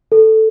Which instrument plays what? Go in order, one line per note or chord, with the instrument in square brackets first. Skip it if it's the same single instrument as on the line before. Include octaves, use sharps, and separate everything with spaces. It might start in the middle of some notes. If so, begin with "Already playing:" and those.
[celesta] A4